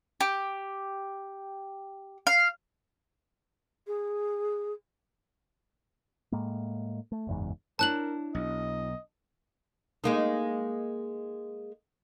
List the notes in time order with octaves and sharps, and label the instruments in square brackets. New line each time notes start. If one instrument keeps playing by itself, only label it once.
[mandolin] G4
F5
[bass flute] G#4
[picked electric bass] A2 G#3 A#3
A3
F#1 E2 G#2
[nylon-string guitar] D4 E4 C#5 [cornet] A#4 [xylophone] A5 F#6 F#7
[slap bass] B1 [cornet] D#5
[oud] G#3 A#3 D#4